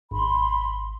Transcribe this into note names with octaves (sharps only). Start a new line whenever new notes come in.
G#1 B5 C6